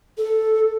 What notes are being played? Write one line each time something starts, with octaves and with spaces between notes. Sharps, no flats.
A4